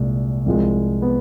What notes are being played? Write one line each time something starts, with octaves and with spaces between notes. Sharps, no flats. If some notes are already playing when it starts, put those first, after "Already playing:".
Already playing: C2 A#2 G#3
C2 C3 F3 G#3
B3